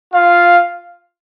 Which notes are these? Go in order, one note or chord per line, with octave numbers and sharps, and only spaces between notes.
F4 F5